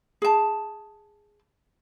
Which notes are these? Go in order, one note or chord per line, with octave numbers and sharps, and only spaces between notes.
G#4 A5